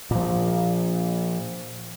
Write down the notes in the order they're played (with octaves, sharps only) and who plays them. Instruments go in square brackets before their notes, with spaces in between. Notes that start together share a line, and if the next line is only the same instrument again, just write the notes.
[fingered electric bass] A#2 F3